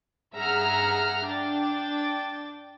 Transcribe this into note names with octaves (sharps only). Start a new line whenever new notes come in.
G2 G#4 E5 F#5 A#5 F6
D4 G5 A6